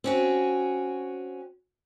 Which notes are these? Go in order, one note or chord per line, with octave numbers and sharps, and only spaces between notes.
C4 C#4 F#4